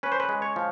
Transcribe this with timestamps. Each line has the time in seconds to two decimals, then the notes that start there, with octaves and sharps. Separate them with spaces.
0.03 C#4 B4
0.12 C5
0.20 B4
0.29 G#3
0.42 C#5
0.56 F3